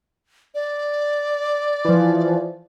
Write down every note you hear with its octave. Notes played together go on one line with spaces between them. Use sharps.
D5
E3 F3